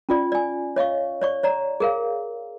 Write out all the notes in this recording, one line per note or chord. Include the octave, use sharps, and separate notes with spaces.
C#4 F4 D5
D5 G#5
C#5 D#5 F5 C#6
C#5 D5 C#6
C#5 D5 A#5
G#4 A#4 F5